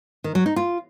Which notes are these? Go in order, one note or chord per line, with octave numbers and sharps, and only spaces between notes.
D#3
F#3
D#4
F4